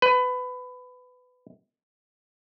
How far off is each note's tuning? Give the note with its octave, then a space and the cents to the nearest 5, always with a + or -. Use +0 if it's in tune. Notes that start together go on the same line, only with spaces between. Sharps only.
B4 +20